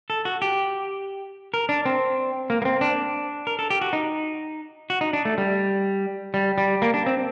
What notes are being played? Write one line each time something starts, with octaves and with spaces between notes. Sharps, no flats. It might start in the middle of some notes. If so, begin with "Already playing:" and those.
A4
F#4
G4
A#4
D4
C4
A#3
A#3
C4
D4
A#4
A4
G4
F#4
D#4
F#4
D#4
D4
A3
G3
G3
G3
A#3
D4
C4